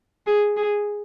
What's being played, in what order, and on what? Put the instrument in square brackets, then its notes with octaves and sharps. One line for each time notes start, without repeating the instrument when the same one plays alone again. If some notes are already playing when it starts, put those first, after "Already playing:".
[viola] G#4
G#4